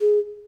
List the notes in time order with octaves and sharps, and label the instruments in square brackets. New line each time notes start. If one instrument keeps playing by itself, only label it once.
[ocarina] G#4